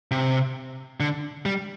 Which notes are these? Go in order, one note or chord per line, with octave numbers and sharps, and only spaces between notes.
C3
D3
G3